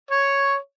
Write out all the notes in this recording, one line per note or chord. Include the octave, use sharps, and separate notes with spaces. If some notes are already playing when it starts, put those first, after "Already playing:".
C#5